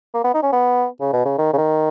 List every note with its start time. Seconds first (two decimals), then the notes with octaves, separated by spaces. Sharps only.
0.14 A#3
0.24 B3
0.34 D#4
0.43 C#4
0.52 B3
1.00 C#3
1.13 B2
1.25 C#3
1.38 D#3
1.53 C#3
1.58 D#3